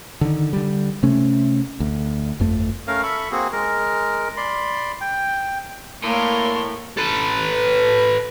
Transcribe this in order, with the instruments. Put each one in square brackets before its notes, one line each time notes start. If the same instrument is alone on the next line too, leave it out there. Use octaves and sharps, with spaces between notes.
[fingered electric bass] D3 D#3
D3 G3
C3 A3 C#4
D2
G1 F2 A3
[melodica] A3 C#4 A#4 F5
A4 E5 B5 C#6
A#3 C4 F#4 G#4
G#3 A#4
D5 B5 C6
G5
[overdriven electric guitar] A2 [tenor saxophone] A#3 [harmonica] D4 A4 C6 [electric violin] A#4 C#5
[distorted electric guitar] A4 B4